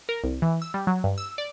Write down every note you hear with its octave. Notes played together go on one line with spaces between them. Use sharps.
A#4
C2
E3
E6
G3
F#3
G2
E6
D5